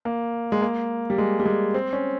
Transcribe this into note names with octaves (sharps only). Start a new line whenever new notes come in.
A#3
G#3
A#3
G3
G#3
G3
G#3
C4
C#4